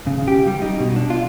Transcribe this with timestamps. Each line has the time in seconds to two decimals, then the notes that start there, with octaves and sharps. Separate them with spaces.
0.07 C#3
0.28 G4
0.47 G3
0.62 D#4
0.80 B2
0.96 D4
1.10 F4